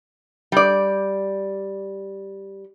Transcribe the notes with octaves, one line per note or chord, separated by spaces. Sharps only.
G3 D5